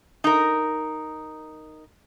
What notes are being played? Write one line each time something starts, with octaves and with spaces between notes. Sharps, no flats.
D#4 A#4